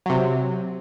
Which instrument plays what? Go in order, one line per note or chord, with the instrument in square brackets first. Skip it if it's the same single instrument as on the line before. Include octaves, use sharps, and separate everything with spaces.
[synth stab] C3 F#3